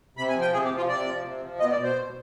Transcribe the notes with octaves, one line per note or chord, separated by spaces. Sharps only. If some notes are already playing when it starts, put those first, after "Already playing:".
C3 B5
G#5
F3
G5
C3 G#4
G4
F3
F4
C3 D5
F3
C3
F3
B2 D#5
D5
B2
C5
B2